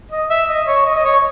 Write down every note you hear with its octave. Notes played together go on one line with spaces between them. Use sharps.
D#5
E5
D#5
C#5
D#5
D#5
C#5